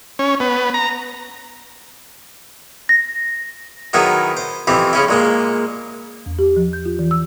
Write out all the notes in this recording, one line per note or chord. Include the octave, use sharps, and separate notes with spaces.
C#4
B3
A#5
A#6
D#3 F#3 B3 E4 G#4
C5
F2 E3 C4 G4
C#3 C#4 E4
A#2 G#3 A#3
E2
G4
F3
G6
F4
E3
E6